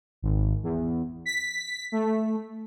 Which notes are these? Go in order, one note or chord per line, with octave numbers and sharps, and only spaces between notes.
G#1
E2
B6
A3